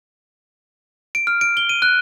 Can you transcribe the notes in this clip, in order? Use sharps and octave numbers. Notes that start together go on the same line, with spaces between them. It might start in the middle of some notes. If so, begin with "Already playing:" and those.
D7
F6
D7
G7
D#7
F#6